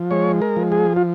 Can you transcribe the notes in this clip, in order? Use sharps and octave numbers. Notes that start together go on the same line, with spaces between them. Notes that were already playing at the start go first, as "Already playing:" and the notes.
Already playing: F3
G#3 C#5
A#4
F3
G#4
F4